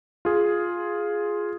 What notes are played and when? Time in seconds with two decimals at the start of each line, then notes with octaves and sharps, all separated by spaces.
0.25 F4 G#4